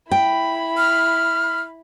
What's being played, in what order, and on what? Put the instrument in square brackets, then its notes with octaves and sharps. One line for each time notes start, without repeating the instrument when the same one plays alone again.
[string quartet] E4 B5 [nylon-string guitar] G5
[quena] F6